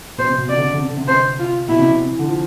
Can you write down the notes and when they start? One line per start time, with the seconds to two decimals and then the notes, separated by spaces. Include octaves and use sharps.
0.18 B2 C5
0.28 C3
0.38 B2
0.48 C3 D5
0.56 D3
0.64 C3
0.73 D3
0.81 C3
0.89 D3
0.97 C3
1.08 C3 C5
1.39 F4
1.68 B2 E4
1.79 C3
1.89 C3
2.09 E3
2.19 D3
2.29 F3